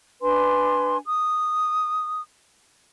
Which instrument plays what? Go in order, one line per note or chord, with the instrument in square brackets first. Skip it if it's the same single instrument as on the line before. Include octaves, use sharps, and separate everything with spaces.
[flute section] D4 B4 G#5 C6
D#6